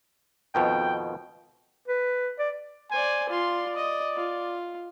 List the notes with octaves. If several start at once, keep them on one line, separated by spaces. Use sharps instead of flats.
F2 B2 D#3 G5
B4
D5
C5 D5 G#5
F4 D5 C6
D#5
F4